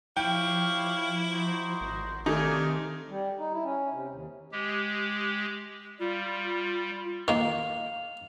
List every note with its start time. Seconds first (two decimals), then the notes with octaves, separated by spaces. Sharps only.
0.17 F3 E4 G4 C#5 F5 G5
1.32 D#4 F#4 C5
1.81 G#1
2.26 C3 D#3 A3 D#4 F4 D5 G#5
3.09 G3
3.39 D#4
3.53 E4
3.65 C#4
3.92 C3
4.09 D#2
4.52 G#3 G4
6.00 G3 F4
7.28 D#3 A#3 F5 F7